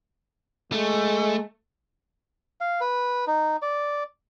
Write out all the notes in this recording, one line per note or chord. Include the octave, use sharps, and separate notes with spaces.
G#3 A3
F5
B4
D#4
D5